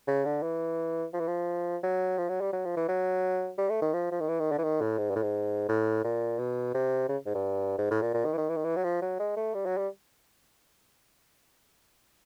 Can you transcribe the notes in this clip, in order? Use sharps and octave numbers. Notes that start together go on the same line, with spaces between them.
C#3
D3
E3
F3
E3
F3
F#3
F3
F#3
G3
F#3
F3
E3
F#3
G3
A3
D#3
F3
F3
D#3
E3
D#3
D3
E3
D#3
A2
G#2
G2
A2
G#2
A2
A#2
B2
C3
C#3
G#2
G2
G#2
A2
A#2
A#2
D#3
E3
D#3
E3
D#3
E3
F#3
F3
F#3
G#3
A3
G3
F#3
G3